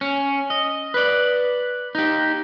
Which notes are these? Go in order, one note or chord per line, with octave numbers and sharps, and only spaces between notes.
C#4
D#5
B4 D5
D#4 G4